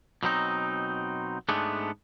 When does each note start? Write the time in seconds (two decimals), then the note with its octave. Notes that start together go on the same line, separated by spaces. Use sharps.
0.23 B2 F#3 C4 D#4
1.49 G#2 G#3 A3 B3 D4